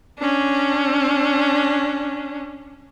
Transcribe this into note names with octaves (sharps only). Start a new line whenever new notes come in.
C#4 D4